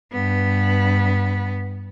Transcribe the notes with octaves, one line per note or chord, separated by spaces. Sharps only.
G2 B3